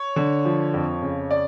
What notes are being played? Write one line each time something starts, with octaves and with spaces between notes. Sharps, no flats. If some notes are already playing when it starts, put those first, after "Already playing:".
Already playing: C#5
D3
F3
F2
C#3
D5